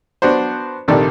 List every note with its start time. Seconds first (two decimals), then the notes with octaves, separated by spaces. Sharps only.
0.22 B3 D4 F#4 C5
0.88 A#1 C3 D#3 A4 D5